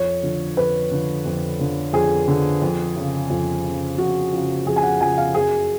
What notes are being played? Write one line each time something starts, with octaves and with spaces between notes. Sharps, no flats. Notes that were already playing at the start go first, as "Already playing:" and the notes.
Already playing: F2 C#5
D3 F3
F2 B4
D3 F3
F2
D3 F3
F2 G#4
D3 F3
F2
C#3 F3
F2
C#3 F3
F2 F#4
C#3 F3
F2 G#4
G#5
F#5
C#3 F3 G#5
F5
F#2 G#4